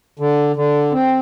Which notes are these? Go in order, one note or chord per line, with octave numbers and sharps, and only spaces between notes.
D3
D3
C4